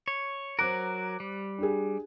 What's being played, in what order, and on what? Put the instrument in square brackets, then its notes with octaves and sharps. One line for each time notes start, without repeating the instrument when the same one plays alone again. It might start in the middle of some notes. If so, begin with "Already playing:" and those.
[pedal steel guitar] C#5
[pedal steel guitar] F#3 A#4 [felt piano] C5 D6 F#6
[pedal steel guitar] G3
[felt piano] D4 G4 G#4